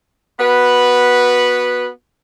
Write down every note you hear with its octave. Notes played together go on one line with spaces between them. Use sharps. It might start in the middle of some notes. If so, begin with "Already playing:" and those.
B3 F#4 B4